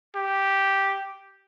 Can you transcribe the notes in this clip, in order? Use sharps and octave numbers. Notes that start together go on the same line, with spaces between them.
G4